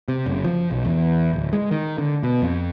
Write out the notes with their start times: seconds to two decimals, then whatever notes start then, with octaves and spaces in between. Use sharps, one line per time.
0.08 C3
0.26 F#1
0.44 F3
0.71 B1
0.85 E2
1.33 D1
1.53 G#3
1.71 D#3
1.98 D3
2.23 B2
2.42 F2